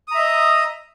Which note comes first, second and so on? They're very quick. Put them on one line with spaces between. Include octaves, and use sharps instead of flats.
D#6 A#5 E5 D#5